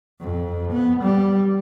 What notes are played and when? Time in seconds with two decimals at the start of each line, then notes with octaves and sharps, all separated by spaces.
0.20 F2
0.72 B3
1.02 G3